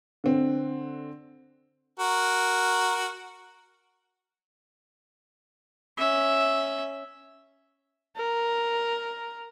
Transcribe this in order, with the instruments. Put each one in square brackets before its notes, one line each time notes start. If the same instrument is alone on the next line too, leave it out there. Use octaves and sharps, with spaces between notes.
[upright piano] D3 C4
[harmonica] F#4 A#4
[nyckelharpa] C#4 E5
[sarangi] A#4